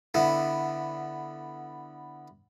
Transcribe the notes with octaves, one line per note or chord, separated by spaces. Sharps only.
D3 B3 E4